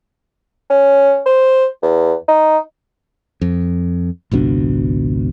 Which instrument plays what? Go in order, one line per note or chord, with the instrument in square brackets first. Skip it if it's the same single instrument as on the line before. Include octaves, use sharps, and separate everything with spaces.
[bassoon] C#4
C5
E2
D#4
[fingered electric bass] F2
G#1 C#2 B2 D4